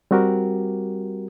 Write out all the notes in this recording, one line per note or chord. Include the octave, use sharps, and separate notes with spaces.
G3 C4 F#4 G4 A#4